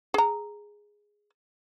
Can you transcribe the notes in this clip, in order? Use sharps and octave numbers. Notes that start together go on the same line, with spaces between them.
G#4 A#5